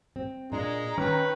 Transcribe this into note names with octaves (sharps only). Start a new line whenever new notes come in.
C4
A#2 G#3 D4 A#5
D#3 C#4 B4